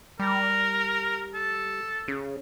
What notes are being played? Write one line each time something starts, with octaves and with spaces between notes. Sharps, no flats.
G3 A#4
A4
C#3